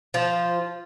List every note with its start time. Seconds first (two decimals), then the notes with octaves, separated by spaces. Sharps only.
0.14 F3 F4